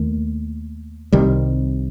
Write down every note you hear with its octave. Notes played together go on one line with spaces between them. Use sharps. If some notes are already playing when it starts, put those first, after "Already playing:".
Already playing: D#2 D#3 A3
C2 C3 D#3 G3